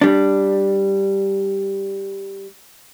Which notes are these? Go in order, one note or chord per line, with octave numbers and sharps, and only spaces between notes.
G3 D4